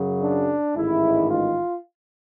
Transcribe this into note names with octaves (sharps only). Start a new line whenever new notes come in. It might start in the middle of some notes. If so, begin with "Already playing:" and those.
Already playing: F#2 C#3 F#3
D4
A1 G#2 D#3 G#3 E4
F4